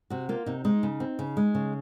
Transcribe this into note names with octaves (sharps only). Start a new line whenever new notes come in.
C3 F#4
A#3 F4
C3 D#4
G#3 D#4
C#3
C4
C#3
G#3
C#3